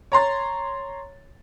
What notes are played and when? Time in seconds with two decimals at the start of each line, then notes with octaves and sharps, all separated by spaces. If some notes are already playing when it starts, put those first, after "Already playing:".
0.12 C#5 A#5 C6 A6